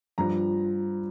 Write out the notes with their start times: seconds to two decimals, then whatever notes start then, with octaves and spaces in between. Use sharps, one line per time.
0.18 G2 F3 A#5